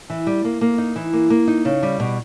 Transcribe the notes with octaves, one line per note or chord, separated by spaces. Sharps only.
E3
G3
A#3
A#3
D#4
E3
A#3
A#3
D#4
C#3
G3
B2